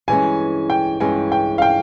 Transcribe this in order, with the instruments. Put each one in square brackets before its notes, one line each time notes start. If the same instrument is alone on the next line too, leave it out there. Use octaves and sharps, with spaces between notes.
[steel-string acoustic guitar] G2 E3 G#3 C#4 [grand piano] G#5
[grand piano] G5
[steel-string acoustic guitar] G2 E3 G#3 C#4 [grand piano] G#5
[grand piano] G5
F5
G5